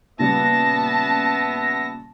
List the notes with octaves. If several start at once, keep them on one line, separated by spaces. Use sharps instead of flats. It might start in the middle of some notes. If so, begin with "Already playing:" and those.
A#2 C#3 G3 B3 E5 A5 A#6